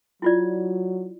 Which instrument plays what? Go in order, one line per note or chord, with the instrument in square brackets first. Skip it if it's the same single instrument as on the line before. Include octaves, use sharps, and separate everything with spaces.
[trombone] F#3 [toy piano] E4 F4 D5